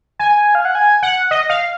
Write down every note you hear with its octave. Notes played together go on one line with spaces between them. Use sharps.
G#5
F5
F#5
G#5
F#5
D#5
F5